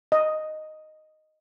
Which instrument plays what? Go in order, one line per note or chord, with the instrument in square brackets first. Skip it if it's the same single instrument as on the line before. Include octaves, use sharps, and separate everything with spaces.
[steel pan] D#5